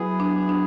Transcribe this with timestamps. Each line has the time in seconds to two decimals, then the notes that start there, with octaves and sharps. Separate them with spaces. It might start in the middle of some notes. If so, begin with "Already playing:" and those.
Already playing: F#3 B3 E4 G#4
0.20 D4
0.49 D4